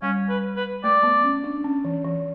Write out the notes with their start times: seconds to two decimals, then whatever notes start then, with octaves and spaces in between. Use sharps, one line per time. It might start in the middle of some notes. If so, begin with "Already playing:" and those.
0.02 G3 C#4
0.30 B4
0.56 B4
0.84 A3 D5
1.03 B3
1.23 C#4
1.44 D4
1.64 C#4
1.84 E3
2.04 E3